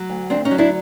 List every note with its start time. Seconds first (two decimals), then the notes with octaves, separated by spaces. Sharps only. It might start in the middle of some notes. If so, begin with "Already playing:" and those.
Already playing: F#3
0.09 D2
0.30 D2 C4 D4
0.45 C#4 D#4
0.51 F#3
0.58 D4 E4